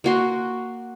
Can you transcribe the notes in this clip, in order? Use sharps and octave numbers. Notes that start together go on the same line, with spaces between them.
A#3 F#4 C6